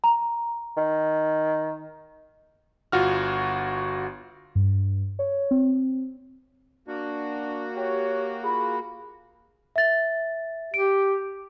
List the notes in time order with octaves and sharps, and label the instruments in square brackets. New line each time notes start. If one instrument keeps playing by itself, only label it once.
[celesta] A#5
[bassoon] D#3
[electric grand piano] G1 F4 F#4 F6
[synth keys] G2
C#5
C4
[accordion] A#3 F#4 [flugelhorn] D4
[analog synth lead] G4 [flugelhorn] C#5
[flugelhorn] F4 [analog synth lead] G#4 [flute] B5
[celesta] E5 A6
[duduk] G4 [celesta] D7